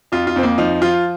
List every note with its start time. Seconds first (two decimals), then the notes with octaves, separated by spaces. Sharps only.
0.12 F2 F4
0.27 F4
0.36 F2 C4
0.43 A#3
0.58 F3 D#4
0.81 F3 F4